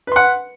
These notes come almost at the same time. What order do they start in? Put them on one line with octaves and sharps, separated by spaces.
B4 C6 F#5